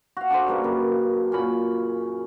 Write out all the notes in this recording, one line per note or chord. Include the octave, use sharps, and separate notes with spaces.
F#4 F5
D4 F#4 A4 C5
C#3 G3 A#3 B4
F#2
A#2 C#4 B5